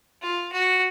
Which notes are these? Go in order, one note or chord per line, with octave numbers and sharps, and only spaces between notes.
F4
F#4